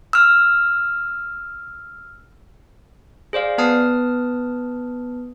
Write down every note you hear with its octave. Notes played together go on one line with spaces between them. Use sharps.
E6 F6
G#4 C5 D5 F5
B3 B4 A5 D#6 F6